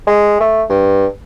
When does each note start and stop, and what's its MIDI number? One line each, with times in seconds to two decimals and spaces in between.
0.07 0.37 56
0.40 0.63 57
0.70 1.06 43